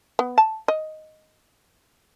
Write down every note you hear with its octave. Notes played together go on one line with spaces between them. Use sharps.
B3
A5
D#5